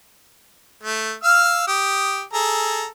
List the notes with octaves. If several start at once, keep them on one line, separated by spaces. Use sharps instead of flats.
A3
F5 E6 F6
G4 D#6
G#4 A4 A#5